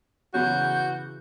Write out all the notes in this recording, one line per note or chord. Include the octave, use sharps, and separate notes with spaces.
E2 C#3 E3 F#3 C#4 F#4 G6